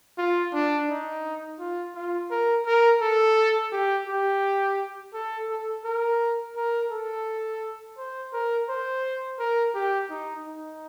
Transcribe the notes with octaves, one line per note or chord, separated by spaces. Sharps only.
F4
D4
D#4
F4
F4
A#4
A#4
A4
G4
G4
A4
A4
A#4
A#4
A4
C5
A#4
C5
A#4
G4
D#4
D#4